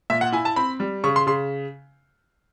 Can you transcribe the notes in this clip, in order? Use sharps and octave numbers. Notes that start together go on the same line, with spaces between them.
A#2 E5
F#5
E4 G#5
A5
C4 B5
G3
C#3 C#6
C6
C#3 C6